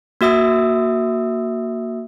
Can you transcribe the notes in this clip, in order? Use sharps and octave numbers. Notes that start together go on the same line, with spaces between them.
A#3 F#4 E5 D#6 E6